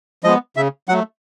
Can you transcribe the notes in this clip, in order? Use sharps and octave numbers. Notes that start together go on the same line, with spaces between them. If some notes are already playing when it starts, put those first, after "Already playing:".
F3 G#3 B3 D#5
C#3 E5
F#3 A3 F#5